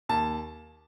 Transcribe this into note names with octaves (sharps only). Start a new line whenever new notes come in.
D#2 A5